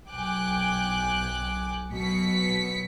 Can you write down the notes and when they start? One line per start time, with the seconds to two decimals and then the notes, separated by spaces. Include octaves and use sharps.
0.10 B1 G5 G#5 D6 F#6
1.93 B2 F#3 B6 C#7